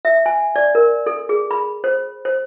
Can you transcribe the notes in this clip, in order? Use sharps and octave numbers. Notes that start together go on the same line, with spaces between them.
E5
G#5
D5
A#4
A4
G#4
B5
C5
C5